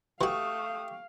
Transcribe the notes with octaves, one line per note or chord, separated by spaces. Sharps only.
E3 A3 F#4 G4 F5 C#6 D#6